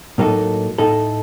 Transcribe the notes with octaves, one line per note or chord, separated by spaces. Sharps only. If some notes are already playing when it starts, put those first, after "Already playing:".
A2 F#3 A#3 D#4 A4
A2 A3 D#4 A4